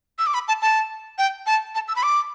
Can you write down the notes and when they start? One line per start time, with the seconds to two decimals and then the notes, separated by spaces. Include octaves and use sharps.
0.18 E6
0.27 D6
0.34 B5
0.48 A5
0.62 A5
1.18 G5
1.46 A5
1.75 A5
1.88 E6
1.96 B5
2.03 D6